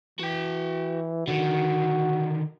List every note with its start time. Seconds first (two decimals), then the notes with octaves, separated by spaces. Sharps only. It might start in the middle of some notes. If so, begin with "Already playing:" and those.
0.19 E3 F#4 G5
1.28 D3 D#3 F#4